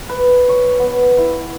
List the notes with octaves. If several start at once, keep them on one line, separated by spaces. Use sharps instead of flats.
B4
C#5
B3
E4